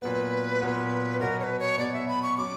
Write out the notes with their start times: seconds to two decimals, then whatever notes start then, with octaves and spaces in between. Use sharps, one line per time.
0.02 A#2 F#3 B3 B4
0.61 A#2 F#3 B3
1.20 B2 F#3 B3 A#4
1.40 C#5
1.43 B4
1.59 C#5
1.78 B2 F#3 B3 D5
1.93 E5
2.08 B5
2.23 C#6
2.37 F#3 C#4 D6